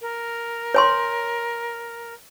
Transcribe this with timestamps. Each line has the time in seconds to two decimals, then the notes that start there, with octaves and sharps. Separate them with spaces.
0.01 A#4
0.74 C#5 G#5 C6